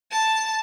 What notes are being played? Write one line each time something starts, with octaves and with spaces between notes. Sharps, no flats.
A5